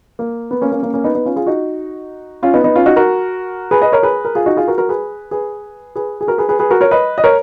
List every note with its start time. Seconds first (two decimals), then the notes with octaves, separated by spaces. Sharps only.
0.19 A#3
0.51 B3
0.62 A#3 C#4
0.72 A#3 C#4
0.83 A#3 C#4
0.94 A#3 C#4
1.04 B3 D#4
1.15 B3 D#4
1.26 C#4 F4
1.36 F4 G#4
1.46 D#4 F#4
2.43 C#4 F4
2.54 B3 D#4
2.64 B3 D#4
2.76 C#4 F4
2.86 D#4 F#4
2.96 F#4 A#4
3.71 G#4 B4
3.82 B4 D#5
3.92 A#4 C#5
4.03 G#4 B4
4.25 A#4
4.35 F4 G#4
4.46 D#4 F#4
4.57 F4 G#4
4.68 F#4 A#4
4.78 F#4 A#4
4.89 G#4 B4
5.31 G#4 B4
5.96 G#4 B4
6.21 G#4
6.27 F#4 A#4
6.38 G#4 B4
6.49 G#4 B4
6.59 G#4 B4
6.70 F#4 A#4
6.81 A#4 C#5
6.91 B4 D#5
7.18 D#5
7.24 A#4 C#5